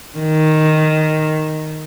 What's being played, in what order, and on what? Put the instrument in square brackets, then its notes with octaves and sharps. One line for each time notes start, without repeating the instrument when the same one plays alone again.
[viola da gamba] D#3